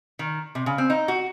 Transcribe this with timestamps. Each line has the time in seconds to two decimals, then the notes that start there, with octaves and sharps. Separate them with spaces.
0.19 D#3
0.55 C3
0.66 C#3
0.78 C4
0.90 D#4
1.08 F#4